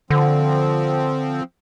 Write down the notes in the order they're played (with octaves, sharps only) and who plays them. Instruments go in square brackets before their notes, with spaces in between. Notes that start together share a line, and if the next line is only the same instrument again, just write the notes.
[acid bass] D3 [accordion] F3 C4